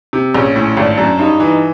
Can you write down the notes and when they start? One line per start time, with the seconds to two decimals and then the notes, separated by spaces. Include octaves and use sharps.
0.13 C3
0.34 A#1 C#4
0.56 A2
0.77 G#1 D4
0.98 F#2
1.19 G2 D#4
1.40 E3